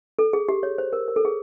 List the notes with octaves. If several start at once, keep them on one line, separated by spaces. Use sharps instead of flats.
A4
G#4
G4
C#5
C5
A#4
A#4
A4
G#4